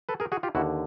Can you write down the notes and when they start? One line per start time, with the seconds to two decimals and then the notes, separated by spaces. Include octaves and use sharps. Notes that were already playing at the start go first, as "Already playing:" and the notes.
0.09 A4 B4
0.20 G#4 A#4
0.32 F#4 G#4
0.43 F4 G4
0.55 D#2 D3 E4 F#4